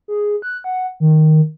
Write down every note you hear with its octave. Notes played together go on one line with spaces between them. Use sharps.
G#4
F#6
F#5
D#3